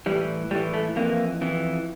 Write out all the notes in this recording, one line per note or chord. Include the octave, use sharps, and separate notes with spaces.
A2 E3 G3
A2 E3 G3
A3
F2 E3 A#3
F2 E3